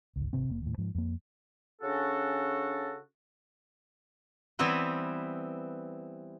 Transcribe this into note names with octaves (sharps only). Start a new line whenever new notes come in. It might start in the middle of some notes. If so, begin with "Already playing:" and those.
G1 C#2
G#1 C3 C4
F1 A#3
D#2 A2
G#2 F3
F2 A#3
C#3 C#4 D4 F#4 A4
E3 G3 B3 C4 E4 B4